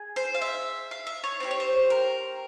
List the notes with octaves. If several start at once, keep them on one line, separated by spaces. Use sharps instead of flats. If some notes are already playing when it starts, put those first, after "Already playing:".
Already playing: G#4
C5
F5
E5
F5
E5
C#5
C4 E4 G4 C5
C#5
C5
A#4